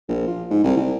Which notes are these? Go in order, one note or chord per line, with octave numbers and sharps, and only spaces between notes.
A#1
F3
G#2
C2
C2